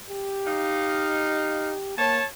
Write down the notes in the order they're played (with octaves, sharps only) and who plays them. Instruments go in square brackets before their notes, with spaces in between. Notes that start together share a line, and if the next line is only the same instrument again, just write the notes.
[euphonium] G4
[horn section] D#4 F5
[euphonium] A#3 [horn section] C#5 A5